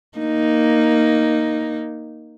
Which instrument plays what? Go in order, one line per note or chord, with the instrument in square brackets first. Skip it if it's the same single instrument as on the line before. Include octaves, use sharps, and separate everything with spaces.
[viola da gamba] A#3 D#4